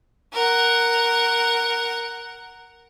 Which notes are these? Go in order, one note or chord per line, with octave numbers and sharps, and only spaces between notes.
A#4 F#5